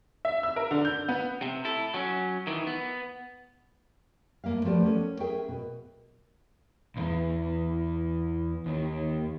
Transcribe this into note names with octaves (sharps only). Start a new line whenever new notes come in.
E5
E6
A#4
D3
G6
B3
C3
E4 A4
F#3 C#4
D#3 E3
B3
G2 E3 A#3 E5 F5
F3 A3 B3 G4 A#4 D5
B3 C#4 A4
G#4 A#4 E5 G5
B2
B1 E2
D#2